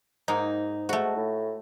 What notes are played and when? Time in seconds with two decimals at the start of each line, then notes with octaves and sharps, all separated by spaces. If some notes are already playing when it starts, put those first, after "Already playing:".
0.28 G#2 A#3 D#4
0.89 G#2 A3 F#4
1.17 A2